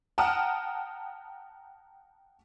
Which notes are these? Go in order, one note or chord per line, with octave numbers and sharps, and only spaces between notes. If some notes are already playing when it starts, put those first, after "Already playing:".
F#5 G5 A5 A#5 D#6 F6